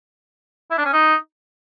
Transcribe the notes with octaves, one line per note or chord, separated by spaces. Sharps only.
E4
D4
C#4
D#4